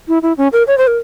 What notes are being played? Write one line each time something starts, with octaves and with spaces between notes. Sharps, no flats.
E4
E4
C#4
A#4
C#5
C5
A#4